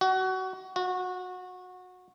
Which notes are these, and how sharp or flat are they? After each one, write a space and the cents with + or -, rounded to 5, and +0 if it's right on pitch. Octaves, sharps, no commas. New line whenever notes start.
F#4 +25
F#4 -20